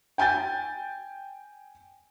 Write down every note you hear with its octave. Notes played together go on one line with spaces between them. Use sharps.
G5 G#5 G6 A6